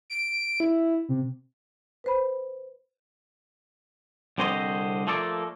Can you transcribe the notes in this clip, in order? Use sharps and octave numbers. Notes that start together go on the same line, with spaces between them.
D7
E4
C3
B4 C5 B5
C2 D3 C4 C5 C#5 D#5
F3 A3 A#3 A4 D5